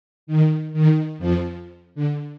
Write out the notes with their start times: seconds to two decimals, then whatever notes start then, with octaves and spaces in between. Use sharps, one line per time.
0.27 D#3
0.73 D#3
1.18 F2 F3
1.95 D3